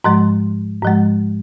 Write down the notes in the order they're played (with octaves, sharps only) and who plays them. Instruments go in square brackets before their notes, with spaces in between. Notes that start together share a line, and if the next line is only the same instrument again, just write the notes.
[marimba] G#2 F3 G#3 C6
G#2 F3 G#3